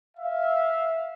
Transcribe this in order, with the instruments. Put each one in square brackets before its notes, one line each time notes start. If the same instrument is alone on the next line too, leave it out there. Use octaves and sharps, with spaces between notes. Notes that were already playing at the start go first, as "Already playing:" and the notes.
[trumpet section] E5 F5